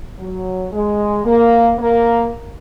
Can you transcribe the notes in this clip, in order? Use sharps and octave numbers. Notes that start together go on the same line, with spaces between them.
F#3
G#3
A#3
A#3